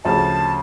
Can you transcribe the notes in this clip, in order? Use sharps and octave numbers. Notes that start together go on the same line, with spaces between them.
D2 C#3 F3 A5